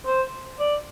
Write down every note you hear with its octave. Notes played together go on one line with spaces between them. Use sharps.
C5
D5